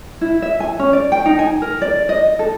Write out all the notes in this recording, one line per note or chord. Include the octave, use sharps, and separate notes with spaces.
E4
E5
G#5
C#4
D5
G5
D#4
G#5
A#4
D5
D#5
A4